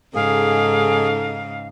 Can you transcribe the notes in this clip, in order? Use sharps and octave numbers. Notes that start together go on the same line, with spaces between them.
G#2 C#3 D#4 G#4 A4 F5